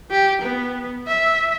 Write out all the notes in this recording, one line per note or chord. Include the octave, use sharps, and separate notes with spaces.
G4
B3
E5